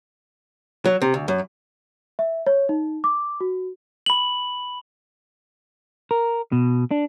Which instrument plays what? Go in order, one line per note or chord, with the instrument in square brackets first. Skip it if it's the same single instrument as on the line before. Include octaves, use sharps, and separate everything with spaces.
[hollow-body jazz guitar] F#3
C3
D2
F#2
[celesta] E5
C#5
D#4
D6
F#4
[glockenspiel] B5 F#7
[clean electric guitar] A#4
B2
D4